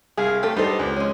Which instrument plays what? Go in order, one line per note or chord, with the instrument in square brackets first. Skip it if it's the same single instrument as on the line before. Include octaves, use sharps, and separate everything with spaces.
[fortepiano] C2 F5 [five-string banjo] G#4
[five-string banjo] A3 G4 A4
[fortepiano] G3 D#4 C5 [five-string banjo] B3 A4
[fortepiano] C#2
[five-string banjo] G#3 C#4